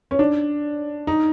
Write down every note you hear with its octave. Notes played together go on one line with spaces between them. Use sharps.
C#4
D4
D#4